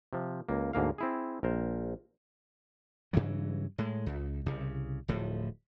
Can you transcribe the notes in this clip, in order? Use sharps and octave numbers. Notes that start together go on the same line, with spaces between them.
C3 F3
C#2 A#3
D2 G#2 A#3 F5
C4 E4 G#4
A#1 A#4 C5
G2 C#3 E3 F#3
A2 G#3
C#2
C2 C#3
D1 A2 F3